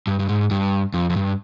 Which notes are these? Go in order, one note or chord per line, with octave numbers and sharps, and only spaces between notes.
G2
G2
G#2
G2
F2
F2
G2